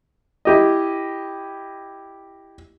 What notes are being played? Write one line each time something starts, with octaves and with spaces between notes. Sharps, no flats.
E4 G4 D#5